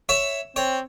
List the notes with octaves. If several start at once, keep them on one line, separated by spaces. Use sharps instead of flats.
C#5 E5
C4 C#5